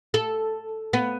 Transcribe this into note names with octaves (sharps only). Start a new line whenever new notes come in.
A4
B3